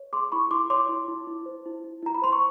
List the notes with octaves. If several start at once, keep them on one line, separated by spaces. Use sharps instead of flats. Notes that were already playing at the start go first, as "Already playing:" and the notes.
Already playing: C#5
G#4 C6 D6
E4 B5 C#6
E4 C6 D6
C#5 C6 D6
E4
E4
E4
C5
E4
E4
E4 A#5
B5
C5 C6
C#6